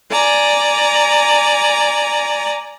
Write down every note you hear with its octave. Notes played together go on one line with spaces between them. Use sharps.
D5 G#5 A#5